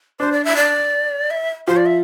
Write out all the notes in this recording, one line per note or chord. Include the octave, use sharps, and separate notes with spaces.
D4 C5
D5
E5
D5
E5
F3 C5
D5
E5